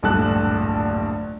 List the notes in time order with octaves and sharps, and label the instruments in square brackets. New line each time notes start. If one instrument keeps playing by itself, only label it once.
[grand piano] D1 A#1 G2 A4 A5 F#6